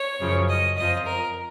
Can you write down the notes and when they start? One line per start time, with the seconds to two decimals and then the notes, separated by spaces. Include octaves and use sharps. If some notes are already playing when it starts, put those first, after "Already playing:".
Already playing: C#5
0.20 F#2 C#3 F3
0.49 D#5
0.77 F2 F3 D#5
1.06 A#4